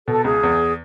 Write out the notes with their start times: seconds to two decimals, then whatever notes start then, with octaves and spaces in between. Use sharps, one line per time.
0.07 B2 A4
0.24 C#2 G#4
0.43 E2